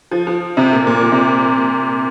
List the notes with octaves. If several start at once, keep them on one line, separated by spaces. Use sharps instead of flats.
F3
F3
C3
A#2
A#2
A#2
C3